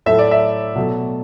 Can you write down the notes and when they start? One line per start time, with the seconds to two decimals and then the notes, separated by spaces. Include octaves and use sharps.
0.06 A2 F#3 A3 E5
0.19 D5
0.31 E5
0.75 B2 F#3 A3